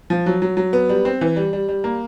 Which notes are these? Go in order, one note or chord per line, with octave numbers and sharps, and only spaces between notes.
F3
F#3
F#3
F#3
B3
G3
C4
E3
G3
G3
G3
A#3